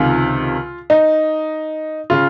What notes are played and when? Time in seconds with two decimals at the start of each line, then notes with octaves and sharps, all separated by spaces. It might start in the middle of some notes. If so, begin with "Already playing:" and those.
Already playing: C#2 C3 D#3 F4
0.90 D#4
2.10 C#3 F4